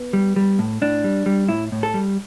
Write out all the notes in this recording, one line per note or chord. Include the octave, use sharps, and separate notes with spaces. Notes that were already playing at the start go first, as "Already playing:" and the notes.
Already playing: B3
G3
G3
A2
A2 D4
G3
G3
A2 E4
A2
A4
G3